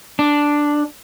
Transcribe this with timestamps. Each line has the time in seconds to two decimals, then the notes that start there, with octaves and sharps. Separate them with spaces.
0.19 D4